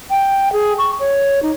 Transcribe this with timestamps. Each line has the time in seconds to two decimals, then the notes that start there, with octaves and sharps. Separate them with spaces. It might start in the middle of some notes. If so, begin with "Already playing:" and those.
0.10 G5
0.52 G#4
0.78 C#6
1.00 C#5
1.42 D#4